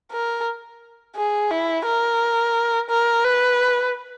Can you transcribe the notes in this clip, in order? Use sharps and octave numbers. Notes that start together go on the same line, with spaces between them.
A#4
G#4
E4
A#4
A#4
B4